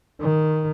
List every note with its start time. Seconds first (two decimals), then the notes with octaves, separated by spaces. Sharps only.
0.21 D#3